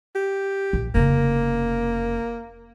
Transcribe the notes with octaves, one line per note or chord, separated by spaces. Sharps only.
G4
A#1
F1 C#3 A#3